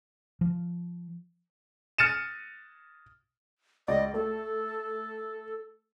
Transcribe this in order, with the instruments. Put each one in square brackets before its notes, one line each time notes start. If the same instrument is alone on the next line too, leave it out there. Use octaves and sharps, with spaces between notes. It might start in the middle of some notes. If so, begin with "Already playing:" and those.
[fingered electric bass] F3
[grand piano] F6 A6 C#7 D#7 E7
[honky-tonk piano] C#2 D5 [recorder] D#5
[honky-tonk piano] A3 [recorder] A4